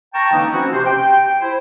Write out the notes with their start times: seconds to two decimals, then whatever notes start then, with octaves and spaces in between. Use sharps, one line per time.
0.14 G5 A5 A#5 C#6
0.33 D3 E3 G#3 A#3 C#4 D#4
0.52 E3 F3 C4 C#4 E4 F#4
0.73 C3 C5
0.86 G5
1.40 E4 C5